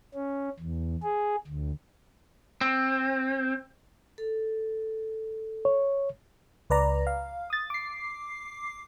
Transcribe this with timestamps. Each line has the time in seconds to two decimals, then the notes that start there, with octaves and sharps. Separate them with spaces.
0.14 C#4
0.59 E2
1.02 G#4
1.47 D2
2.61 C4
4.18 A4
5.65 C#5
6.70 C#2 B4 D5 A#5
7.07 F5
7.50 D#6 A6
7.70 D6 C7